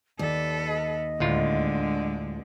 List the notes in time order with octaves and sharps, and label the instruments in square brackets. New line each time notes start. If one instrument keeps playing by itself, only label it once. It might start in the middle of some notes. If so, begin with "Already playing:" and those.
[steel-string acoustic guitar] D#2 [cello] A4 B4 [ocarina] D5
[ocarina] D#5
[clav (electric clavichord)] D2 A2 F4 [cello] D3 G#3